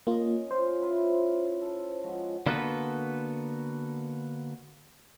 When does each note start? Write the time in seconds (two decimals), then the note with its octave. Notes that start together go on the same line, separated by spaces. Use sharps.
0.07 A#3 C#4 F4 D#5
0.51 C#4 F4 C5
0.80 C#4 E4 F4
1.61 A4
2.04 F3 G#3 F#4
2.46 D3 A#3 B3 F#4 A4 B4